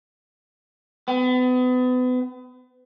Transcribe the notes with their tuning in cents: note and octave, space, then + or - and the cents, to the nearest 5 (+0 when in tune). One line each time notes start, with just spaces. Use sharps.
B3 +35